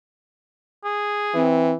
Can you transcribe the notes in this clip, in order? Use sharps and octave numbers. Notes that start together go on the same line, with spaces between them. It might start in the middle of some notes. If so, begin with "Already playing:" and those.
G#4
E3 C4